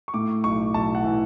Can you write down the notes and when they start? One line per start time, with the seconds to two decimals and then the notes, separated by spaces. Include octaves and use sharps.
0.08 C#6
0.14 A2 D6
0.44 B1 C#6
0.74 B1 A5
0.95 F#5
1.04 E3